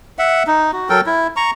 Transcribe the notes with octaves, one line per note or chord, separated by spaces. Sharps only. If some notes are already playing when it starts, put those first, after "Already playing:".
E5 F#5
D#4
F#4
F#3 A4 A#4 G5
E4
A#5 C#6